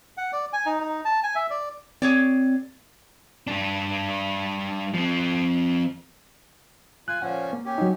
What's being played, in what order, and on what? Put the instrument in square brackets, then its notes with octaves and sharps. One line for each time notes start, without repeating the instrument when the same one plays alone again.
[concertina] F#5
D5
G#5
D#4
D#4
A5
G#5
E5
D5
[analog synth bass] C4 [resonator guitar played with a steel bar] G#4 C#5 D5
[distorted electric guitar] G3 D4
F3 C4
[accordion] F4 G#5 [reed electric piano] F#6
[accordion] A#2 F3 C#4 [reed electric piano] F#5
[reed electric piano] A#3
[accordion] C#4 G4
[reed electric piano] F#3 D#4